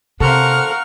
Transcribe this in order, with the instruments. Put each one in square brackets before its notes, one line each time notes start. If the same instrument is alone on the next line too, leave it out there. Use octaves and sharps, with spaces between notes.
[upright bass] C3 [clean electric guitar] A4 C5 [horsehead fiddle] A#4 F5 [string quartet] F#5 C#6 F6